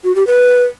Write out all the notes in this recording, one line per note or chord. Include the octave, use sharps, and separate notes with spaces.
F#4
G4
B4